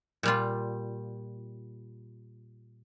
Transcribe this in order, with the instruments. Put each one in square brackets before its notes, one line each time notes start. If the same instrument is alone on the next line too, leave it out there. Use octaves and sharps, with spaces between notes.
[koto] A#2 G3 F4